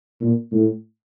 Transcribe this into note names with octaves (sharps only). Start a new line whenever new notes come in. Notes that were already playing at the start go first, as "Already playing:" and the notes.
A#2
A2